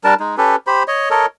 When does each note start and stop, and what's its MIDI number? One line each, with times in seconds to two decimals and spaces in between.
0.04 0.14 55
0.04 0.14 62
0.04 0.14 70
0.04 0.14 81
0.20 0.36 56
0.20 0.36 63
0.38 0.56 61
0.38 0.56 67
0.38 0.56 69
0.38 0.56 71
0.67 0.83 67
0.67 0.83 72
0.67 0.83 83
0.88 1.09 73
0.88 1.09 75
1.11 1.26 69
1.11 1.26 70
1.11 1.26 73
1.11 1.26 75